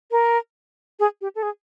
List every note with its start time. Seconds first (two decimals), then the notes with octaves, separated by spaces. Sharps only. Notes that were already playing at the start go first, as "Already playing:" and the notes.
0.11 A#4
1.00 G#4
1.21 G4
1.35 A4
1.43 G#4